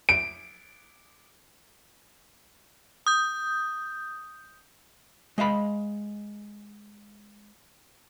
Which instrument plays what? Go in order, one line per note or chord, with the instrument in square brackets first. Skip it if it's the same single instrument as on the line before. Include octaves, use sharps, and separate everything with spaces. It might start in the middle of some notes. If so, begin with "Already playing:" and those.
[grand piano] D7
[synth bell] D#6 G6
[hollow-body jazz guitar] G#3 D#5 F5 B5